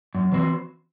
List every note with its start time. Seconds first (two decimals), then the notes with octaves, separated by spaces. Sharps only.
0.15 F#2
0.32 E3 C4 F#4